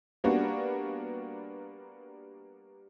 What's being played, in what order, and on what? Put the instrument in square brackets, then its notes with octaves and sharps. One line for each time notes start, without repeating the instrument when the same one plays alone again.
[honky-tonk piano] G3 A#3 B3 D4 F#4